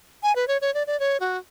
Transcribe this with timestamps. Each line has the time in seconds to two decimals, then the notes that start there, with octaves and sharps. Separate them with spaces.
0.23 G#5
0.36 B4
0.48 C#5
0.61 C#5
0.74 D5
0.87 D5
1.00 C#5
1.20 F#4